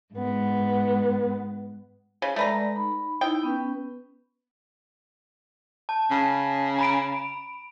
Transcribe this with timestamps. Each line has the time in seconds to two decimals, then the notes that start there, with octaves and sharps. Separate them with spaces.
0.13 G#2 B3
2.22 C#3
2.36 G#3 A3 B4 D5 A#5
2.76 D#4 B5
3.21 D#4 E4 G5
3.43 B3 C#4 B4
5.89 A5
6.11 C#3
6.78 A#5 B5 D7